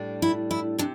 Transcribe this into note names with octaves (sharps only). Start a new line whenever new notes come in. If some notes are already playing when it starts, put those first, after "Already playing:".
Already playing: A2 G3 D4
E4
E4
C3 D4